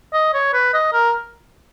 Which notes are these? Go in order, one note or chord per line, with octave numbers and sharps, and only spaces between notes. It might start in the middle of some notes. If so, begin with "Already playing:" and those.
D#5
C#5
B4
D#5
A#4